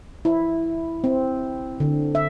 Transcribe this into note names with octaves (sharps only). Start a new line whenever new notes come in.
E4
C4
D3
E5